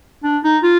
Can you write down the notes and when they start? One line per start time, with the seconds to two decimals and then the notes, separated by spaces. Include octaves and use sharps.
0.24 D4
0.44 D#4
0.63 F4